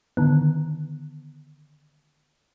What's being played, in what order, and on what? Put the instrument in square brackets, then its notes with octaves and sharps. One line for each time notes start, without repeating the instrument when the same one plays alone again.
[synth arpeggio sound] D3 D#3 B3